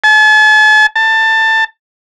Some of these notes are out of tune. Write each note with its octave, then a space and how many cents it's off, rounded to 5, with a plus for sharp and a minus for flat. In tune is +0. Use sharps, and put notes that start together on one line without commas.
A5 -45
A5 +15